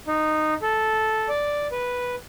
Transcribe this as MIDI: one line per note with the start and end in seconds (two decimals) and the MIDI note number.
0.08 0.54 63
0.62 1.28 69
1.29 1.67 74
1.71 2.15 71